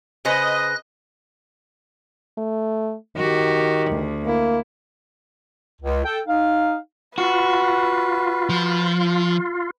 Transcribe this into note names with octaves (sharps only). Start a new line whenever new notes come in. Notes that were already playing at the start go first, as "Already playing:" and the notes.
C#3 B4 C5 D#5 F#6 A#6
A3
D#3 F#4 G4
D2
A#3 E4
C#2
A4 G5
D#4 F5
F4 F#4 B4
F3